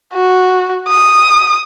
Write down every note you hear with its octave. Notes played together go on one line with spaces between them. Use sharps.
F#4
D#6